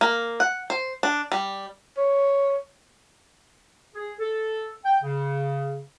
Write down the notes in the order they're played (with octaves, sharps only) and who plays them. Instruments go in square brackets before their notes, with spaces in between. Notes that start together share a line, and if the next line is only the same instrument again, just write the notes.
[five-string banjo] A#3
F#5
C5
D4
G3
[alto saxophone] C#5
[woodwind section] G#4
A4
G5
C#3